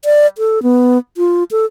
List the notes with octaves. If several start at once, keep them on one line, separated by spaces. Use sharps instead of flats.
D5
A4
B3
F4
A4